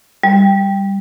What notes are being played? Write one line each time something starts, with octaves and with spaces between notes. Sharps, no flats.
G3